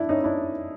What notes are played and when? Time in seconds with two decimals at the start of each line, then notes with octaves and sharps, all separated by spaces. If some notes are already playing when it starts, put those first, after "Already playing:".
Already playing: D4 E4
0.09 C#4 D#4
0.24 D4 E4